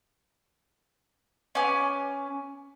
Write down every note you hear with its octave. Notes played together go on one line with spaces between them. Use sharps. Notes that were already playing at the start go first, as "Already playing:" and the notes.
C#4 B4 G#5 D6